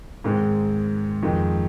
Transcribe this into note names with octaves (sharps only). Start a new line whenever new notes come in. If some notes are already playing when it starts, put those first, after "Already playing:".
G#2 D#3 G#3 C4
F2 D#3 G#3